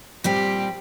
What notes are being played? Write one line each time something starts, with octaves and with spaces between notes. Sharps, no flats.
A#2 G3 C4 G4